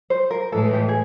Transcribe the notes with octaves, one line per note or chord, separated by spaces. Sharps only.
C5
A#4
A2 E3 G#3 A4
G4
G#4